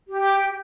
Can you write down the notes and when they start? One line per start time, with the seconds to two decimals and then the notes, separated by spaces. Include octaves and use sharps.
0.08 G4